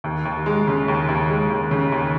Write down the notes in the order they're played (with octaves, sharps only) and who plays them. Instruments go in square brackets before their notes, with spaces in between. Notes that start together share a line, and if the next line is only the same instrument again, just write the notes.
[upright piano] D#2
D#2
G#3
C#3
D#2
D#2
G#3
D#2
C#3
D#2